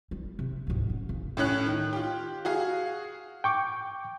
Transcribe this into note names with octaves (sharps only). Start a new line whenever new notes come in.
G3
C3
D2 G#2
F#2
C#3
A2 C#4 C#5 F#6
D#3
F4 G4
F#4 G#4 F5
G5 C#6 D6